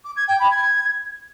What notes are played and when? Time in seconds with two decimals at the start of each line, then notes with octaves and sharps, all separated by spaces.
0.04 D6
0.16 G#6
0.27 G5
0.39 B5
0.51 G#6